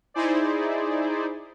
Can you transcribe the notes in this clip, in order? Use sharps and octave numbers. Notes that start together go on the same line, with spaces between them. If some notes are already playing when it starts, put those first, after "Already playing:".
D#4 E4 G#4 C5 D5